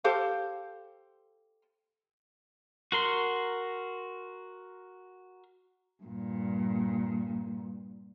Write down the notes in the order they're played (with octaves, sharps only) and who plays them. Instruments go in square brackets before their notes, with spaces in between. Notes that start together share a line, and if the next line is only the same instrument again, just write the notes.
[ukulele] G4 A4 C5 F5
[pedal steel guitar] F#4 A#4 C6
[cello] G2 A#2